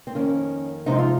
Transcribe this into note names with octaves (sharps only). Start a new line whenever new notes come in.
C4
F2 D#3 A#3 C#4
C3 F3 G#3 C4 D#4
F4